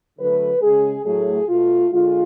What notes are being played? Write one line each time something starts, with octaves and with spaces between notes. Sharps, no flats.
D3 F#3 A3 B4
C#3 G#3 G#4
A2 F#3 A3 G#4
B2 A3 F4
D3 G#3 F4